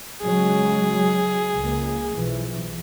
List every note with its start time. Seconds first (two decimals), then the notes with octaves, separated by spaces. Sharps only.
0.22 C#3 F#3 G#3 G#4
1.56 C#2 A#3
2.12 B1 E3 F3